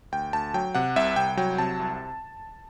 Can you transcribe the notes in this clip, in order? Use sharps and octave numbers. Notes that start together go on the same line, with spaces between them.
D2 G5
D2 A5
F#3 G5
C3 F#5
C2 E5
C2 G5
F#3 G5
C3 A5
C2